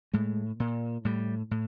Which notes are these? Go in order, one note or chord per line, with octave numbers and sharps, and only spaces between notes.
A2 G#3
A#2
A2 G3
A2